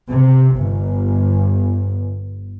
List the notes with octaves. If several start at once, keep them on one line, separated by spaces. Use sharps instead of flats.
C3
G1